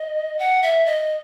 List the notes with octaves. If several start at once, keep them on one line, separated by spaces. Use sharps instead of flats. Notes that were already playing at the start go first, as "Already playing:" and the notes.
Already playing: D#5
F#5
E5
D#5